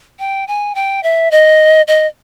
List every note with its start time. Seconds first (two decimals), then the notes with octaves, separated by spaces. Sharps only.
0.19 G5
0.48 G#5
0.75 G5
1.03 E5
1.31 D#5
1.88 D#5